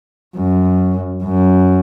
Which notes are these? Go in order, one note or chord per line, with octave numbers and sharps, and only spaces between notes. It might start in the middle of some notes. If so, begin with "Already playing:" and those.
F#2
F#2